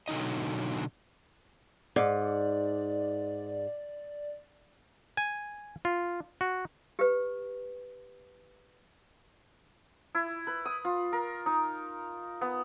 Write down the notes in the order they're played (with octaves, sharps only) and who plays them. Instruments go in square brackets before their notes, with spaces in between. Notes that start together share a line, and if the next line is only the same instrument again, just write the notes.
[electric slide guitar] B2 D3 F#3 D#4 D#5
[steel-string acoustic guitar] G#2 [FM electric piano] D5
[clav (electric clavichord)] G#5
F4
F#4
[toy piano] G4 B4
[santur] E4
B4
D#6
F4
A#4
D#4
B3